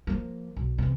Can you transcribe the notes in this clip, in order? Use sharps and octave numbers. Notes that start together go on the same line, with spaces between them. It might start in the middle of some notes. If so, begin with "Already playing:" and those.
F3 A#3
B1
E2 C3